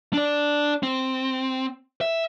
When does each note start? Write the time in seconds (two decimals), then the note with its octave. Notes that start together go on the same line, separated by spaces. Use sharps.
0.13 D4 D5
0.83 C4
2.01 E5